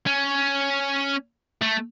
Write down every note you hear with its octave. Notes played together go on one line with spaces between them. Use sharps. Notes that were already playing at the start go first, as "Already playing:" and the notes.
C#4
A3